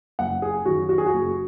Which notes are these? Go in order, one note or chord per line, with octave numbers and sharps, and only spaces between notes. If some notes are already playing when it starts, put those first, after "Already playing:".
F#1 F#5
G#4
F#2 D#3 F#4
F#4
G#4
F#4
F#1